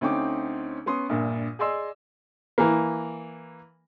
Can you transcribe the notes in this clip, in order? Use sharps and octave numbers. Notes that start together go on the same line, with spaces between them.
D2 C4 C#4 D#4 G5 D6
B3 C#4 C6 D#6
A#1 G2 A#2
G#4 D5 D#5 G#5 C6 E6
E3 A#3